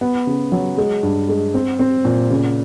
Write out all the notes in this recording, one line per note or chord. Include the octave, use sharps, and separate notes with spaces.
B3
C#3
F#3
G#3
G2
G#3
C4
C4
A#2
C#3